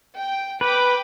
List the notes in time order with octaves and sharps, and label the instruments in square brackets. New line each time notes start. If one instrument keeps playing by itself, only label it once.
[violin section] G5
[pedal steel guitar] B4 [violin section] G5 B5 D6